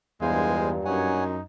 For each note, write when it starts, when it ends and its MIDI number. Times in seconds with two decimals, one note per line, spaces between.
0.22 0.79 40
0.22 1.37 43
0.22 1.37 46
0.22 0.75 56
0.22 0.70 72
0.22 0.70 77
0.22 0.70 80
0.85 1.41 42
0.85 1.42 63
0.85 1.24 73
0.85 1.24 78
0.85 1.24 80